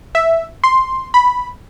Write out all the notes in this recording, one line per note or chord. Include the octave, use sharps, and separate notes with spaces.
E5
C6
B5